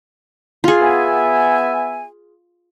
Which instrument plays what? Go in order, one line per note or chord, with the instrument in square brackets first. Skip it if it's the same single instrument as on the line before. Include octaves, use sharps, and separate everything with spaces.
[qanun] F4 G#4
[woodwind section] B3 E5 G#5